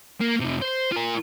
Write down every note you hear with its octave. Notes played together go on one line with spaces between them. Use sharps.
A#3
F2 C3
C5
F4 A#4